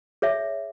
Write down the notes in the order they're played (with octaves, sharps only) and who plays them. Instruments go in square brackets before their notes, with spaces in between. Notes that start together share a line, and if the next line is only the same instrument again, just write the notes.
[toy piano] G#4 C#5 E5